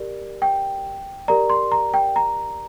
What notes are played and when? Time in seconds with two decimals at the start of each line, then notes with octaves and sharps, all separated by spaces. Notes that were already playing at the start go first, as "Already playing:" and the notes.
Already playing: G4 A#4 D5
0.42 G5
1.28 G4 A#4 D5 A#5
1.50 C6
1.72 A#5
1.94 G5
2.16 A#5